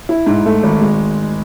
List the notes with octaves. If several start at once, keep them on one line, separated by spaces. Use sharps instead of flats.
E4
G#2
A3
G#1
G#3